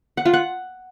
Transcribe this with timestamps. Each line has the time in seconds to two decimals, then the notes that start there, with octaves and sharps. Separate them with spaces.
0.17 F#5
0.25 F4
0.34 F#5